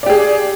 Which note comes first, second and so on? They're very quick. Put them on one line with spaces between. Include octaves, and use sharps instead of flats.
D5 G4 G#4